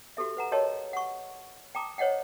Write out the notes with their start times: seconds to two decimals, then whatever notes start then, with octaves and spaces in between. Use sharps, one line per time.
0.17 F#4 G4 A4 E5
0.37 B4 F#5 A#5
0.52 F#4 G4 A#4 C#5 D#5 A5
0.93 F#5 C#6
1.75 G5 A5 A#5 D6 D#6
1.98 C5 C#5 D#5 F#5 G5